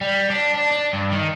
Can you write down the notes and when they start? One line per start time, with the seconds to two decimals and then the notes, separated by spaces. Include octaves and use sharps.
0.01 G3
0.30 D4
0.54 D4
0.71 D4
0.93 G2
1.12 D#3